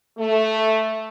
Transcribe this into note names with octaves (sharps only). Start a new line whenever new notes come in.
A3